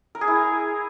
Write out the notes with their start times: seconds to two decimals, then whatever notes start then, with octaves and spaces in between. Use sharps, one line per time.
0.15 A#4
0.21 G#4
0.27 E4
0.34 G#5